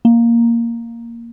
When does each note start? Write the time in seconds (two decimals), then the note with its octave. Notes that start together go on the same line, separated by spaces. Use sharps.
0.05 A#3